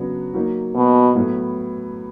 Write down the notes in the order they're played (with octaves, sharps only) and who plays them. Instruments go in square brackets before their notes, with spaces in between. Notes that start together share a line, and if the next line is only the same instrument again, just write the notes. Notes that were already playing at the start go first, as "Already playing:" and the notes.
Already playing: [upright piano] C#3 F#3 B3 D4
F#3 A#3 D#4
[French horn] B2
[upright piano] A2 F#3 B3 E4